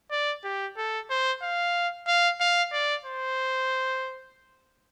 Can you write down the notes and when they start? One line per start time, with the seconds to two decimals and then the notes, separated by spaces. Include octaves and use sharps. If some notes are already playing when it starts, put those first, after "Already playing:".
0.11 D5
0.44 G4
0.77 A4
1.10 C5
1.42 F5
2.08 F5
2.40 F5
2.73 D5
3.05 C5